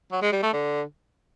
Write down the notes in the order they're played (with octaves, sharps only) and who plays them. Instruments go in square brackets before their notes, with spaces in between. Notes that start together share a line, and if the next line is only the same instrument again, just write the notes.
[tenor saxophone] F#3
G#3
G3
A3
D3